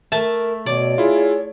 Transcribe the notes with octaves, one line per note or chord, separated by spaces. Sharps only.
A3 A#4 E5 A5
B2 C#5 D5
E4 F4 G#4